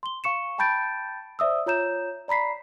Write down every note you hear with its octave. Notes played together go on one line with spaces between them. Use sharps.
C6 G7
F5 C#6 C#7 E7
G5 A5 B5 G6 A6 D7
C5 D5 E5 D#6 E6
F4 C#5 A#5 G6 E7
D5 A#5 B5 B6 C7